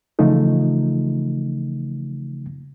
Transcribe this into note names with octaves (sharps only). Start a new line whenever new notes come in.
C#3 E3 F3 A3 D#4 F4